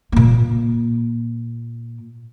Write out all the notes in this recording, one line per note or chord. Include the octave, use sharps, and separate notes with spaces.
A#2 A#3